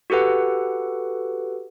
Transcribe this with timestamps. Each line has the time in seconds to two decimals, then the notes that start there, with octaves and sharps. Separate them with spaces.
0.10 F#4 G4 A4 B4 F#5